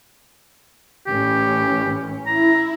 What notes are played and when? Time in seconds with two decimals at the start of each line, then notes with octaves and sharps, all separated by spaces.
1.07 A1 E3 C#4 G4
2.26 E4 A#5